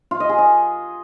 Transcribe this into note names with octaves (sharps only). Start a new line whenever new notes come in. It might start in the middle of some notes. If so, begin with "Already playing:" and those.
F4
D#5
G#4
D#5